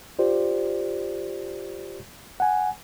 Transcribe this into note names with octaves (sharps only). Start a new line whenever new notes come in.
F4 G4 C5 D5
F#5 G#5